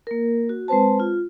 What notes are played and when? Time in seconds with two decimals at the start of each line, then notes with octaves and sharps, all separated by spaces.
0.07 A#3 A#4
0.49 F#4
0.68 G#3 C4 B4 C5 A5
1.00 F4